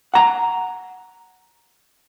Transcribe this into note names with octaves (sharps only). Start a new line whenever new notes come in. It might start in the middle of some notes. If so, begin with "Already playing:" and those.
F#5 A#5